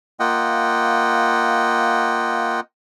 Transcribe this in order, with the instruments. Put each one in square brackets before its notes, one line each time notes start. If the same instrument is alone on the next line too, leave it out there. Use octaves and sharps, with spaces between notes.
[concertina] A#3 F4 D#5 F#5 G5